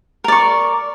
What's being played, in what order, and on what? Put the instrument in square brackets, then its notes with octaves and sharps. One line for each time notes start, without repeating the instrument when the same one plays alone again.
[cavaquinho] A#4
D5
C#6